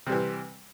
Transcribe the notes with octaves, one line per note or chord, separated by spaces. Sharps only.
C3 E3 G3